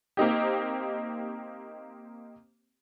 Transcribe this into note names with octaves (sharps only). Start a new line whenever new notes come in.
A#3 C4 D#4 G4